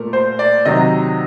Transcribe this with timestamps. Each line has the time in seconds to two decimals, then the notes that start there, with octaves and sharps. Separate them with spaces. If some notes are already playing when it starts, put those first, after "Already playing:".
Already playing: A#2 A3 A#4
0.13 C5
0.39 D5
0.65 C3 D#3 F#3 D#5